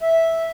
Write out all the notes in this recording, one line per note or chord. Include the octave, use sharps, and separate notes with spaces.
E5